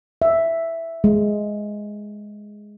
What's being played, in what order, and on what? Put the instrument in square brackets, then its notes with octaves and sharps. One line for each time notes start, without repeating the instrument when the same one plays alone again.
[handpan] E5
G#3